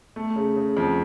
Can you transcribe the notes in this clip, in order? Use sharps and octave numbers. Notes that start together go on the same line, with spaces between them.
A3
C#3
C#3
F2